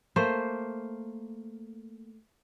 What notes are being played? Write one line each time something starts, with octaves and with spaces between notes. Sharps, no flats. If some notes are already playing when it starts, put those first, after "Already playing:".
A3 A#3 C5